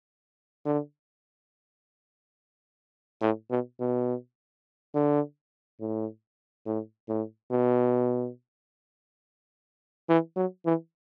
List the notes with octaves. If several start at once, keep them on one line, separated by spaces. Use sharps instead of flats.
D3
A2
B2
B2
D3
A2
A2
A2
B2
E3
F#3
E3